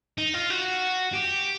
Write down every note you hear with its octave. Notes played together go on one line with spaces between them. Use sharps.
D#4
F4
F#4
G4